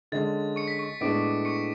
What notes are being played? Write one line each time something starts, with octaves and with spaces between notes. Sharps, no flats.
D3 G#3 C#4 A6
C#6 C#7
B6
C#6 C#7
A2 G#3 B3 D4 D6 D7
C#6 C#7